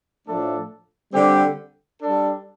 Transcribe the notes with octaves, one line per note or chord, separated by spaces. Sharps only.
A2 F3 A3 D4 A4
D3 G3 C4 G4
G3 D4 A4